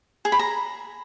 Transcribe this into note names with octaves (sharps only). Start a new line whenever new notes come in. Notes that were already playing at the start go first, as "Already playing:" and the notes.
G#4
B5
A#5